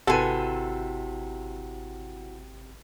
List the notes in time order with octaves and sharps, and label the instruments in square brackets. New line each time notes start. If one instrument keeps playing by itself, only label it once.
[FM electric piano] G#1 [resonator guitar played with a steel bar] C3 G#5 [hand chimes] E4 F#4 F#5 [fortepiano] A4 B4